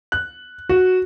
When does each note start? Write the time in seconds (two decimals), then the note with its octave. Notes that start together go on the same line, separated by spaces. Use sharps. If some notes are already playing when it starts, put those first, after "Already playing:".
0.12 F#6
0.69 F#4